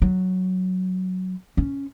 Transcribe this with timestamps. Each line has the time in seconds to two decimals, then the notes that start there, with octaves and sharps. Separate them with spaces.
0.02 F#3
1.57 C#4